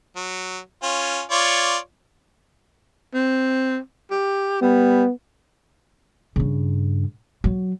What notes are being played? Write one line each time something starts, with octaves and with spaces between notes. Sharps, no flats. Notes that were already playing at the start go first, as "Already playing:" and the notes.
F#3
C#4 F4
F4 C#5 D5
C4
G4
G3 B3
G2 C#3
F#3